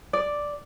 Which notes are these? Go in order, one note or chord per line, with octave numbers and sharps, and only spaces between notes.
D5